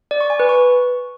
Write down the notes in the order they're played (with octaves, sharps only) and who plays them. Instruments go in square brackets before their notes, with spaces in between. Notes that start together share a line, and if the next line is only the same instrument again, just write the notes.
[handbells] D5
C#6
G#5
B4
C#6